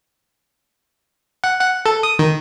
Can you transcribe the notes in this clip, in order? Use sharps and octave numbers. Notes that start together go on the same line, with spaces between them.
F#5
F#5
A4
D#6
D#3